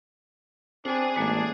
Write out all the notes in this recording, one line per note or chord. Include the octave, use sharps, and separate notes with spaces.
C4 D4 G#4 G#5
A1 G#3 A#3 D4